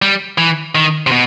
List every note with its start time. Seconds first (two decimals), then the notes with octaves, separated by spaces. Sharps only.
0.02 G3
0.38 E3
0.75 D#3
1.07 C3
1.11 B2